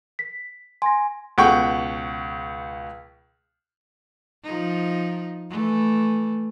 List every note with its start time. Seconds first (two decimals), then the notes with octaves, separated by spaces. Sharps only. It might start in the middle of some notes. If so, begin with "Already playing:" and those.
0.19 B6
0.82 G#5 C6 A#6
1.38 C#2 B2 F#5 G5 C#6
4.43 F3 D#4
5.50 E3 A3